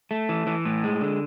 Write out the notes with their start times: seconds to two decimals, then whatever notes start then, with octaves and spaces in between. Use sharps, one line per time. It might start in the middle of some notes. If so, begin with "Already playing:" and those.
0.11 A3
0.29 E3
0.47 E3
0.65 A2
0.84 G#3
1.01 D3